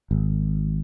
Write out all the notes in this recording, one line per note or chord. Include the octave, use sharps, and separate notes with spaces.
G#1